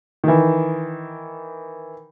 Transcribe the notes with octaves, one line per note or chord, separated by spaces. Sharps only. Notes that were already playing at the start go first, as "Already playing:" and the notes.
D#3 E3